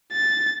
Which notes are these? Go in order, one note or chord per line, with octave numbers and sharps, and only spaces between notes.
A6